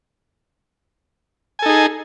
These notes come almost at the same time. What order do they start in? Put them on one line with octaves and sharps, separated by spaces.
G#5 A4 D#4 G#4